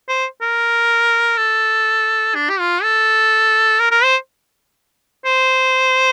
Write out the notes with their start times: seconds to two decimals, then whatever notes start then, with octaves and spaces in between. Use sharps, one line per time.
0.09 C5
0.41 A#4
1.37 A4
2.35 D4
2.49 G4
2.59 F4
2.83 A4
3.80 A#4
3.91 A#4
4.03 C5
5.25 C5